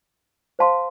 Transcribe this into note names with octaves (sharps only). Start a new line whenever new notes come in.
C5 F5 A5 C6